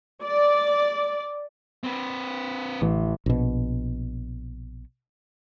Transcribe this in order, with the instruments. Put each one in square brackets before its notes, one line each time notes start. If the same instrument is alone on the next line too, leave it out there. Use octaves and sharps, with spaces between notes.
[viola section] D5
[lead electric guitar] C4 B4
[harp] A1
[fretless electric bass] A#1 B2